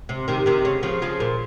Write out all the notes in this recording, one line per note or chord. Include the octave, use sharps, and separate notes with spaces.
C3
C3 D#3
C3 D#3
C#3
C#3 F3
C#3 F3
A#2